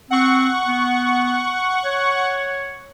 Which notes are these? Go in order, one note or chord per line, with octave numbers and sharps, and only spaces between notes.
C4 F#5 C#6
B3
C#5